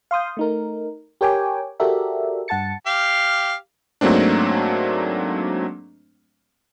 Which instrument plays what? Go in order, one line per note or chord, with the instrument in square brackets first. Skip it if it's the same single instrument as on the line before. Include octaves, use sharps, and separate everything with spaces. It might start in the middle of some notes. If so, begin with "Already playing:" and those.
[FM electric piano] F5 C6 D#6 G6
A3 D#4 A#4
G4 A#4 C#5 G5 G#5 D6
F#4 G4 A4 A#4 D5 E5
G2 F#5 A5 A6 C#7
[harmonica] G4 F5
[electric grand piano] G#2 F#3 A3 A#3 C4 D4